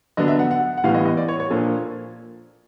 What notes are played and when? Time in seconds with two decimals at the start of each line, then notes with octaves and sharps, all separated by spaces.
0.17 D3 F#3 B3 D4 D#5
0.28 E5
0.39 F#5
0.51 F#5
0.77 F#5
0.84 A2 E3 G3 B3 F5
0.95 D#5
1.05 D#5
1.17 D5
1.28 C#5
1.40 C#5
1.50 A#2 F3 A#3 D4 A4